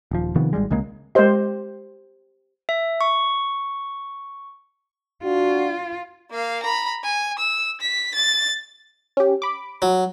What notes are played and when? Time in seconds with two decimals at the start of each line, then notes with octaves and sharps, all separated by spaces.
0.11 D#1 F3
0.36 C3 D#3 F3 B3
0.53 G#1 E2 G3 G#3
0.71 C2 C#3 G#3 A#3
1.15 G#3 G4 A#4 C5 D#5
2.69 E5
3.01 C#6
5.24 D4 F4 F#4
6.31 A#3 F5
6.63 A#5 B5
7.04 G#5
7.39 E6
7.81 B6
8.15 A6
9.17 C#4 G4
9.42 B5 D6
9.82 F#3